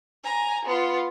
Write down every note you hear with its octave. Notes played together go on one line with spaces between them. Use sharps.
G#5 A#5
B3 F4